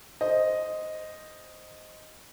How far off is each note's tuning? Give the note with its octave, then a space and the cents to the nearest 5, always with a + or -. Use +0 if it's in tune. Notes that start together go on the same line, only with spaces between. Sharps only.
C5 +0 D#5 +0